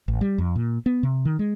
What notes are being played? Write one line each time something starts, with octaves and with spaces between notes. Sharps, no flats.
A1
G3
F2
A#2
B3
C3
D#3
G#3